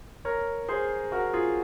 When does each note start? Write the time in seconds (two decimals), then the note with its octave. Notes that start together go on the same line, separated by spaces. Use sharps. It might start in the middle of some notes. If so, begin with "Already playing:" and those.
0.25 A#4 C#5
0.69 G#4 C5
1.12 F#4 A#4
1.33 F4 G#4